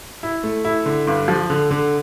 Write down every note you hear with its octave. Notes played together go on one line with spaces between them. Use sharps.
E4
A3
E4
D3
G2
F3
D3
D3